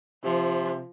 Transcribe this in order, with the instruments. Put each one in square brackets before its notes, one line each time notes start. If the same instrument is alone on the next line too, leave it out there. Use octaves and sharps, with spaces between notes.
[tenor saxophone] C3 [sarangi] F3